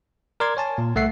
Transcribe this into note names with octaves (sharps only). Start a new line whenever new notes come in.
A#4 D5 C6 G#6
C#5 G#5 A5
A#2
C2 A3 E5 F#5 C7